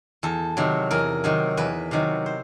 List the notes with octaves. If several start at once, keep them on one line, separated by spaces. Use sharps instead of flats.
E2 A4
C3 D#3 F#3
E2 A#4
C3 D#3 F#3
E2 B4
C3 D#3 F#3
C5